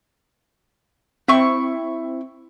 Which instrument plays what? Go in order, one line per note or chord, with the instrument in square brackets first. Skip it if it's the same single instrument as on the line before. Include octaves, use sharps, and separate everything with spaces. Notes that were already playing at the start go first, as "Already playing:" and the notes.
[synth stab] C4 [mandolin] E4 C#6